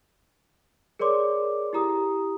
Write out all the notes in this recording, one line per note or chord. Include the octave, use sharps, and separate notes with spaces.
G#4 A#4 C#5 D5 C6 D6
E4 G4 A#5 D#6